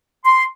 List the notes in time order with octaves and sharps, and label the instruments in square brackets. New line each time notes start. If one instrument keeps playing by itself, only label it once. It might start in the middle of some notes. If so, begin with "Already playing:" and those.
[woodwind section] C6